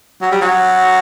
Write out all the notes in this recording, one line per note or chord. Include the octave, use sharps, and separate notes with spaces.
F#3
G3
F#3